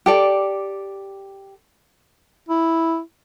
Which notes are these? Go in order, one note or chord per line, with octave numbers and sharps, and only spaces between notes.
G4 A4 D5
E4